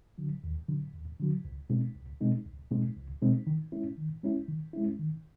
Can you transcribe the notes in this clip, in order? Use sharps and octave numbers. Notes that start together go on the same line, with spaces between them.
D3 F#3
D#2
D3 F#3
D#2
D3 F#3
C#2
B2 G#3 C4 D#4
C#2
B2 G#3 C4 D#4
C#2
B2 G#3 C4 D#4
C#2
B2 G#3 C4 D#4
D#3
G#3 C#4 E4
D#3
G#3 C#4 E4
D#3
G#3 C#4 E4
D#3